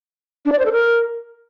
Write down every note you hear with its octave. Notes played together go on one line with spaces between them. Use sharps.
D4
D5
C5
A4
A#4